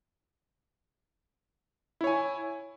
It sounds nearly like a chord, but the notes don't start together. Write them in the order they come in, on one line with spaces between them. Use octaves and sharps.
E4 C#5 G#5